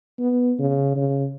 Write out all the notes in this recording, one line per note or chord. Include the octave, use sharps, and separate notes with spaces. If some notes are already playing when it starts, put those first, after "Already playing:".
B3
C#3
C#3